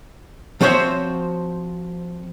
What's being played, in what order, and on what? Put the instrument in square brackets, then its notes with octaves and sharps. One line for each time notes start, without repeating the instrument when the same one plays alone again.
[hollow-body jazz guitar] F3 C4 F#4 C5 C#5 E5